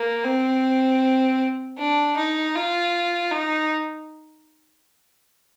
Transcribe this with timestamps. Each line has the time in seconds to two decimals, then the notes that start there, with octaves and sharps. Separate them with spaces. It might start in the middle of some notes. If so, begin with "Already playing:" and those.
Already playing: A#3
0.24 C4
1.78 D4
2.16 D#4
2.55 F4
3.31 D#4